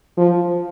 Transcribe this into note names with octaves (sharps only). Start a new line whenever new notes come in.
F3